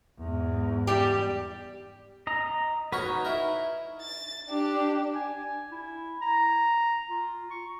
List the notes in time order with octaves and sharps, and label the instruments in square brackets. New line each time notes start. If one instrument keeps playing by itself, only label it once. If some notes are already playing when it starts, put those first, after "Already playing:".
[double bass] E2 G#2
[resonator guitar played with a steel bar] G3 G4
[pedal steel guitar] D#5 A#5
[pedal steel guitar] D#4 B4 [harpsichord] F#4 A#4 C#5
[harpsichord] E4 A#4
[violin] A6
D4 G4
[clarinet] G#5
E4
A#5
F4
C#6